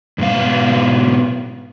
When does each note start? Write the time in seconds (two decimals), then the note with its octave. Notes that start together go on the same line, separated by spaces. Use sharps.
0.18 E2 G#2 B2 G#3 F5